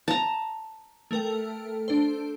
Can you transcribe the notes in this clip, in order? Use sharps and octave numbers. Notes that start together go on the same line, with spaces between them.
A5 A#5
A3 A4 A#4 G5
D4 C5